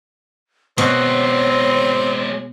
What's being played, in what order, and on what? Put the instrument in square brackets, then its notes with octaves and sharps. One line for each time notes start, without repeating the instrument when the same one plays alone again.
[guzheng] B2 [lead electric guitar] G#3 F#4 [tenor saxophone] C4 [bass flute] C#5